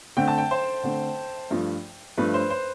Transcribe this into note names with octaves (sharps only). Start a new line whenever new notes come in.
D3 A3 C4 G5
A5
G5
C5
D3 A3 C4
G2 F3 A3
G2 F3 A3 B4
C5
C5